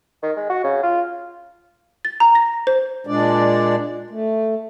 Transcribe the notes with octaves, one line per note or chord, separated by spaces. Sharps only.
D#3
G#3
F#4
C#3
F4
A6
A#5
A#6
C5
A#2 G#3 D4 D5
A3